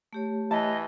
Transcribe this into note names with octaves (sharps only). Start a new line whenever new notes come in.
A3 G4 C#5
E3 D#5 A5